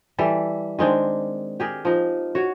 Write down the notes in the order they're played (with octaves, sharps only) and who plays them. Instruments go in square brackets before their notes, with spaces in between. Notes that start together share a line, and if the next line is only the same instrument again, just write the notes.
[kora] E3 G3 A4
D#3 G#3 C4 D4
G4 G#4 A#4
F3 D#4
F#4 C#5